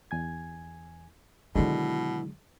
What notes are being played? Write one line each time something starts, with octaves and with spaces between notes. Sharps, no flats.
E2 G#5 G#6
B2 D3 D#3 F#3 G#3 E4 F4